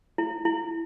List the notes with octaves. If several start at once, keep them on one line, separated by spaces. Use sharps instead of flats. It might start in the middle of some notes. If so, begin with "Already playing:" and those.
E4
E4